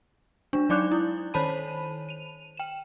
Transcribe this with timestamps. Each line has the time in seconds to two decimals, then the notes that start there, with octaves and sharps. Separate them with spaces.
0.53 G#3 D4
0.69 F#3 D#4 D5 D6 F#6 G6
0.92 E4
1.34 D#3 C5 C#5 A5 B5 D#7
2.09 D#7 F7
2.57 G5 E7